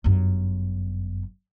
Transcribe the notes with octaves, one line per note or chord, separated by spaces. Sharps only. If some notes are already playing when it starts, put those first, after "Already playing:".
G1 F#2